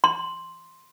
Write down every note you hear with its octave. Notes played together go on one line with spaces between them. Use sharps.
C6